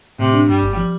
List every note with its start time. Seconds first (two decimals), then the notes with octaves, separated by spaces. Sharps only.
0.19 A2 C3
0.34 D4
0.49 G2 G3
0.63 G1
0.77 F3